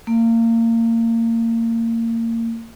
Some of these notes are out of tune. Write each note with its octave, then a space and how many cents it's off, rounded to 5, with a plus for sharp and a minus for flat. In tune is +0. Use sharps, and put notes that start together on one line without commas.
A#3 -30